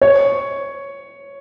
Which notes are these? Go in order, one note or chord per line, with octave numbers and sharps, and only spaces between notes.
C#5